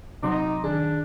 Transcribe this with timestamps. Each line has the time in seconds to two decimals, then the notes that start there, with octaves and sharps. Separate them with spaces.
0.23 C3 F#3 D#4 C6 D6
0.64 D#3 D4 G#4